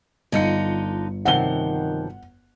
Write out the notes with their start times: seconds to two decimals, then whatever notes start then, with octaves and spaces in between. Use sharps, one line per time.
0.32 G1 D3 D#4 F4 C#7
1.25 F#2 C3 D#3 F3 F#5 G7